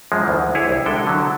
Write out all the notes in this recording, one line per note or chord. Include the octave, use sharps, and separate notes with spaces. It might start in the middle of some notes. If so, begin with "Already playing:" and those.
F#2 F3 G#3
D2 E3
E4 G#4 C#5
C2 E4
D3 G3 G#3 A4 G5
D3 F#3